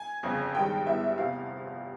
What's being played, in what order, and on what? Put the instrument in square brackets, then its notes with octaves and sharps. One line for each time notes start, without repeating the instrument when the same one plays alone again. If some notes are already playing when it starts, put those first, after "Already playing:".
Already playing: [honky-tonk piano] G#5
G1 F2 C#3
G2 D#3 G#3 G5
G1 G2 E3 G#3 B3 E5
F1 E2 C3 F3 F5